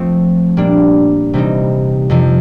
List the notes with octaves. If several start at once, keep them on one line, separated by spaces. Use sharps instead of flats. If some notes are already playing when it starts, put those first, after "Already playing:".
Already playing: F3 A3 C4
A#2 G3 A#3 D4
C3 E3 G3 C4 D#4
F2 C3 F3